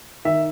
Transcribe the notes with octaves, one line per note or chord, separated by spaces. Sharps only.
D#3 E5